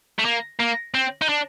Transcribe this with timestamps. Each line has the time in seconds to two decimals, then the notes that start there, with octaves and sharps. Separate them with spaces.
0.19 A3
0.25 A#3
0.60 A#3
0.94 C4
1.22 D#4
1.29 D4